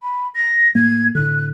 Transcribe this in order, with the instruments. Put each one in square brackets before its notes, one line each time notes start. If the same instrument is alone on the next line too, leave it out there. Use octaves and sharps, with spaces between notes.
[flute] B5
A#6
[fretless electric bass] A2 A#3 [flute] G#6
[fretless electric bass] A2 D3 [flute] F#6